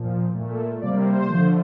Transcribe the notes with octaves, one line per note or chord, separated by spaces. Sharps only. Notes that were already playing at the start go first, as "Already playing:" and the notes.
Already playing: A#2 F3
A#2 A3
C3 G3 A#3 D5
C5
D3 F3 A3